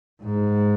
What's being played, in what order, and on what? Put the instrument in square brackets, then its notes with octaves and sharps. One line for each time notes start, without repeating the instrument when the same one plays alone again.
[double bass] G#2